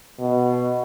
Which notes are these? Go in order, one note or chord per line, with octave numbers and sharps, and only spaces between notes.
B2